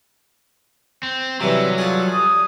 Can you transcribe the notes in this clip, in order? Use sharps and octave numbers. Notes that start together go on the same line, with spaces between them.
C4
C3 E3 F#3 G3 E5
F4 G#4 A4
D#6